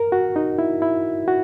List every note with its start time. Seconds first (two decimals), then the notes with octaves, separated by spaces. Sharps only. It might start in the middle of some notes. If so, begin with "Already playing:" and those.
Already playing: A#4
0.12 F#4
0.36 D#4
0.58 E4
0.82 E4
1.28 F#4